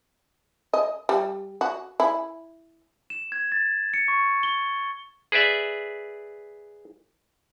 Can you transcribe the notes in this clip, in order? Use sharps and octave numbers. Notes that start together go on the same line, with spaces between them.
D#5
G3
F#4
E4
E7
G#6
A6
C#7
C#6
G7
G#4 B4 D5 E5